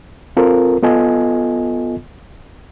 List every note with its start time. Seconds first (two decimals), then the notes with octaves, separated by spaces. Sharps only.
0.37 C4 F4 A4 A#4
0.83 B3 F4 A4 D#5 G#5